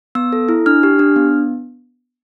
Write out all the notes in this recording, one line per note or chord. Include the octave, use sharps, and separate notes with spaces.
B3 E6
A4
E4
D4 F6
G4
D4
B3